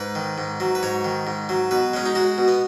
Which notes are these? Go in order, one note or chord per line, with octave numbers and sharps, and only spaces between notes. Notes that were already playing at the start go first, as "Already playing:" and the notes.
Already playing: G#2 B4
D#3
G#2
F#3
B4
G#2 C#5
D#3
G#2
F#3
B2 B4
G#3 C#4
D#4
G#3 F#4
B2
B3